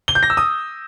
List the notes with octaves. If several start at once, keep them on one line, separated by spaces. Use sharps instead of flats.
G7
G6
A#6
E6
D#6